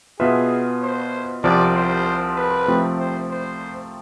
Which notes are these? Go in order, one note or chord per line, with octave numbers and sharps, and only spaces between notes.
B2 B3 F4 G#4 B4 E5
C5
C2 C3 F3 D5
C5
B4
C3 F3 A3 C4
C5
C5